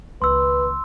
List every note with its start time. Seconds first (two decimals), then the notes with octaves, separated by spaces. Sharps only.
0.22 C#2 D#3 B4 C6 E6